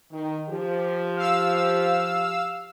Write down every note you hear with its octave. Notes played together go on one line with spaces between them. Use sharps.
D#3
F3 G4
F5 E6